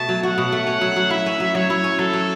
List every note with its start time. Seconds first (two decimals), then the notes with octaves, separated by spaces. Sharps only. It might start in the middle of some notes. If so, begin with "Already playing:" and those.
Already playing: B2 A3 A5
0.09 F#3
0.23 F#4 F#5
0.38 B2
0.52 A3
0.67 C#4
0.81 F#3
0.96 F#3
1.10 E4 E5
1.26 C#4
1.40 F#3
1.55 F#3 C#5
1.70 E4
1.84 C#4
1.99 F#3 A4
2.13 F#3